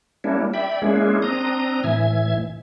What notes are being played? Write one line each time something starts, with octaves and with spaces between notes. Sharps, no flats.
G3 A#3 C#4 D4 E4
D5 E5 G5 B5
G#3 A#3 C#4 D4 E4 G#4
C4 D4 A#5 D#6
A2 E3 E5 G#6